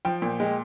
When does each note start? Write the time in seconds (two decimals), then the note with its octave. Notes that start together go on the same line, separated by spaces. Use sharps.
0.05 F3 G5
0.22 A#2
0.40 G#3